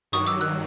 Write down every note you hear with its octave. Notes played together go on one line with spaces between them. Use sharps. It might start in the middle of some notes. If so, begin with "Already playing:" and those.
G2 D#3 F#3 C#6 D#6
D6 E6
E6 F#6